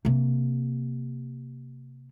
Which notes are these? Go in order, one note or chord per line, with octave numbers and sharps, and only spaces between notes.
C3 A#3